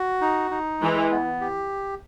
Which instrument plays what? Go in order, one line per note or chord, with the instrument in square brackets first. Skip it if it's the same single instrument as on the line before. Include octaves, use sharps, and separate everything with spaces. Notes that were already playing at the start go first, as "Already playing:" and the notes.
Already playing: [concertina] F#4
D#4
D#4
[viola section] E3 [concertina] G#3
[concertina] B3
G4